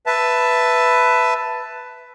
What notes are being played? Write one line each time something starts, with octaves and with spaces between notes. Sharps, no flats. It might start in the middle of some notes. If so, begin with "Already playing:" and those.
B4 E5 A5